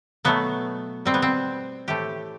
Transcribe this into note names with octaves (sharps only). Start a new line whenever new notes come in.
B2 F#3 A3 B3
B2 G3 C4
B3
C4
A2 E3 A3 G4